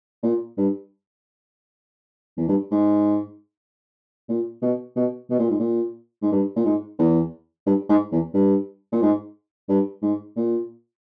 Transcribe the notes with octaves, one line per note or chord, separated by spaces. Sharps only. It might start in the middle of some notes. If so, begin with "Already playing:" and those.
A#2
G2
E2
G2
G#2
A#2
B2
B2
B2
A#2
G#2
A#2
G#2
G2
A#2
G#2
E2
G2
G#2
E2
G2
A#2
G#2
G2
G#2
A#2